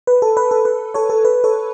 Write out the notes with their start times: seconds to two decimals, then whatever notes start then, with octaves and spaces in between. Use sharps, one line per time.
0.07 B4
0.22 A4
0.37 B4
0.51 A4
0.65 B4
0.94 A4 C#5
1.10 A4
1.25 B4
1.44 A4 C#5